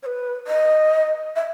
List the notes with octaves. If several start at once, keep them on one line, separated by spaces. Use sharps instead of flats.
C#5
B4
D#5
E5